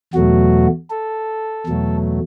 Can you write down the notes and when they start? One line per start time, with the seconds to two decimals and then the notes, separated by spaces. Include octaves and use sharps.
0.14 E2 B2 F#3 A3 F#4
0.90 A4
1.67 E2 B2 F#3 A3